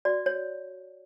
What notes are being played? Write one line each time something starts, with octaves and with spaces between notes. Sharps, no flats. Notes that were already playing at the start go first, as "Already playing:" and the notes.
F#4 D5
C#5